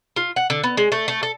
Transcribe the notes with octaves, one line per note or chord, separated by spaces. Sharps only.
F4
F#5
D3
B3
G#3
A3
A3
A4